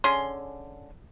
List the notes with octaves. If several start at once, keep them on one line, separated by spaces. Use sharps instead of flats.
D3 C#4 G#4 C6